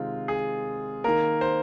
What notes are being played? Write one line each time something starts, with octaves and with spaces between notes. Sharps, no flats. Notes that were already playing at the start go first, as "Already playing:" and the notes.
Already playing: C3 D#3 G#3 C4 F4
G#4
D#3 A#3 A#4
C5